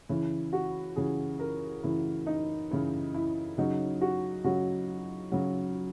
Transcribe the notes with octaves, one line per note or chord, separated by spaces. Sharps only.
C#3 E3 E4
F#4
C#3 E3 G#4
A#4
C#3 E3 E4
D#4
C#3 E3 E4
E4
C#3 F#3 D#4
F#4
C#3 F#3 F#4
C#3 F#3